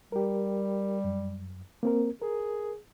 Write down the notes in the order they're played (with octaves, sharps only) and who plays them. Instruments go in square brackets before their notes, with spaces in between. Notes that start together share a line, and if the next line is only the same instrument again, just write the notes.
[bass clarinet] G3 [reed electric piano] G4 A#4
[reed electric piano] F#2
A#3 C4 A#4
[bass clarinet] G#4 [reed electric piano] A#4